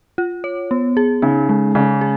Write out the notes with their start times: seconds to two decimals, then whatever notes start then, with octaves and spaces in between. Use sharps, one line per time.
0.18 F4
0.44 C#5
0.71 B3
0.97 G#4
1.22 C#3 D#4
1.49 G#3
1.75 C#3 C#4
2.01 G#4